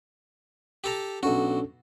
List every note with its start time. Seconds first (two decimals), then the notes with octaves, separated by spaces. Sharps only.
0.84 G4 A4 A#5
1.23 B1 C#4 D4 F#4 A4